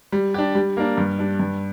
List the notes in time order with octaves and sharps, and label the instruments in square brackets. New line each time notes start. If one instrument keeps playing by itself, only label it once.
[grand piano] G3
D4 G4
G3
A#3 D4
G2
G3 D4
G2